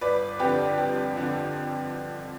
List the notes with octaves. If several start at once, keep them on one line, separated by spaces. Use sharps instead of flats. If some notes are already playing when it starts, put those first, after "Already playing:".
G1 B4 D5
F2 D3 G4 B4
G1 G4
F2 D3